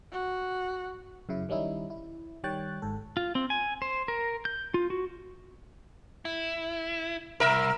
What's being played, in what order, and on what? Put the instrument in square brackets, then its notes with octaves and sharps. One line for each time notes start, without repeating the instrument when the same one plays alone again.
[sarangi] F#4
[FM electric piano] F#2 C#3 E4
D#3 G3 C#4 D#4 E4
E4
D#3 G3 C#5 G5 F#6 A6
G#1 G#2 A4
[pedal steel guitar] F4
C4
G#5
C5
A#4
G6
F4
F#4
[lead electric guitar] E4
[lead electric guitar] C2 [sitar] A#4 E5